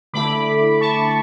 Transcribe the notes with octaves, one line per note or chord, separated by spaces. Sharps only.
D3 A3 E4 B5 D6
A5 C#6